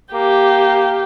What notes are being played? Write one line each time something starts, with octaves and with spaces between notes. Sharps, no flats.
A#3 G4